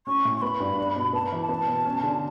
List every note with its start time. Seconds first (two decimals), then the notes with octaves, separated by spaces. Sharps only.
0.07 C#4 C#6
0.25 A2
0.37 C#6
0.42 B3 B5
0.60 G2
0.78 D4
0.96 B2
1.13 B3 A5
1.28 E3 B5
1.41 A5
1.49 B3
1.68 B2
1.85 C#4
2.03 D3